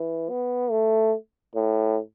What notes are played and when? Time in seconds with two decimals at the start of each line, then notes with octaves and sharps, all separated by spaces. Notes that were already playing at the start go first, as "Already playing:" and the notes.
Already playing: E3
0.30 B3
0.71 A3
1.55 A2